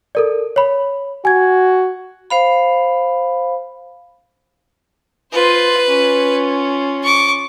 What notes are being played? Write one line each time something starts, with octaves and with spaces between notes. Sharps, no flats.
A4 A#4 D5
C#5 B5
F#4 G#5 G#6
C5 F5 B5
F4 B4 C5
C#4 F4
C#6 D6